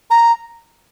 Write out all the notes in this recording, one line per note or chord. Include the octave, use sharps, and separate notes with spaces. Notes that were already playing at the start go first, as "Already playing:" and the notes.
A#5